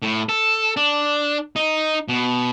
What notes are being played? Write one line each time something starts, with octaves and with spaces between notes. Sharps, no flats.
A2
A4
D4
D#4
B2